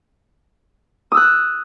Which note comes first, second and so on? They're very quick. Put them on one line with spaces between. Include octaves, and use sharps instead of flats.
D#6 E6 F#6